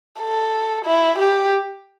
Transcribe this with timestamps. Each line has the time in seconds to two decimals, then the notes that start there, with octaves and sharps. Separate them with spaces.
0.20 A4
0.85 E4
1.19 G4